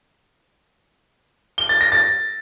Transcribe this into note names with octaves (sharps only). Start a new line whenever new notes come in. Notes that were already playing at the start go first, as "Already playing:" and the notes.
G7
A6
A#6
A6